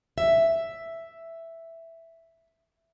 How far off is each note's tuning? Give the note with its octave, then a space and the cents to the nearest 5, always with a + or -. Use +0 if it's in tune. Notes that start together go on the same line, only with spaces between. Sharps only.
E5 +5